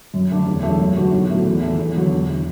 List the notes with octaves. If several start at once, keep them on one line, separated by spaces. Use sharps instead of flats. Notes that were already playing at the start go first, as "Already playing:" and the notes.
F#2
D3 A3 D4 A4
E1
E2 B2 F#3 A3
F#2
D3 B3 D4 F#4
B1
A2 A3 F#4 A4
E2
E3 D4 A4
E2
D3 F#3
E1
E3